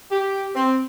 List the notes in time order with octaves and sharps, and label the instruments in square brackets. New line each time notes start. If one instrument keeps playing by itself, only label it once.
[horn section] G4
C4